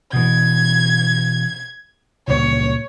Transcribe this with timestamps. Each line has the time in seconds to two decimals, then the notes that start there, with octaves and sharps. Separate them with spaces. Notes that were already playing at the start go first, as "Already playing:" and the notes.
0.13 B2 E3 G#6
2.27 C#2 A#2 G3 C#5